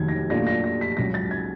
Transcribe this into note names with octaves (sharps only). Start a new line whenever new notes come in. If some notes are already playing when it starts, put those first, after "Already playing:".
Already playing: F1 D#2 D#3 F#3 G#6
A#6
A#2 F#3 A3 D4 F4 A#6
A#6
A#6
B6
C#2 C#3 F#3 A#6
A6
G#6